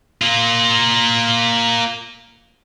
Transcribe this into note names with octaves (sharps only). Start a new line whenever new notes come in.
A#3 F4